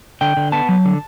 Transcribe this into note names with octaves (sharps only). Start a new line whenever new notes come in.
D3 G5
D3
B3 A5
F#3
D3